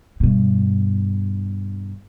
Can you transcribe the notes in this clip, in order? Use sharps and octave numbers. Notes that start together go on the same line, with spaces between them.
G2 B2